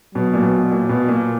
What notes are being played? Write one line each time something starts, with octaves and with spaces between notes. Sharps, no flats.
B2 F#3
A#2
B2
A#2
B2
A#2